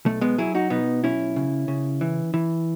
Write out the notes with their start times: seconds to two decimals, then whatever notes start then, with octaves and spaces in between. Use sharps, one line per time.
0.06 B1 A3
0.21 G#3 B3
0.38 F#3 E4 G#4
0.55 D#4 F#4
0.70 B2 B3 D#4
1.04 B1 C#4 E4
1.36 C#3
1.68 C#3
2.01 E3
2.34 E3